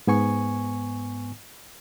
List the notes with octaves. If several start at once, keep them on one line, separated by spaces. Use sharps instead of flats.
G#2 B3 G#5 C#6